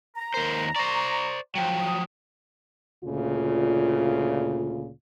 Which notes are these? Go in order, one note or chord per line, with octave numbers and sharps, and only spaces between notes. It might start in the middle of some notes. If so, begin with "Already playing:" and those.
A#5
D#2 A#4 C5
C5 D5 C#6
F3 F#3 G5
D#6
D2 A#2 C#3 F4